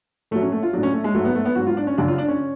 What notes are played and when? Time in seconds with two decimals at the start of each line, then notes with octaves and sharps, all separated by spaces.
0.31 A2 A3
0.35 F#3
0.42 C#4
0.52 A3
0.63 F4
0.73 F#3 D4
0.77 A2
0.83 C#4
0.94 A3
1.04 G#3
1.14 G#2 F#3 A3
1.25 B3
1.35 A3
1.45 B3
1.55 G#2 F#3 F#4
1.67 F4
1.77 D4
1.87 C#4
1.98 F#2 C#3 F#3 D4
2.08 F4
2.18 D4
2.28 C#4